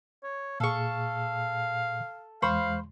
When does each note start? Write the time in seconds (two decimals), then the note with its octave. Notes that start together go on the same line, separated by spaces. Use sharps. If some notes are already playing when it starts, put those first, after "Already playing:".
0.23 C#5
0.60 A#2 G#4 A4 F5 C#6
2.42 E2 G#3 C5 F5 B5 C#6